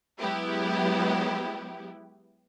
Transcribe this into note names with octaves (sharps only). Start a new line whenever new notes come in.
F#3 G#3 B3 E4 G4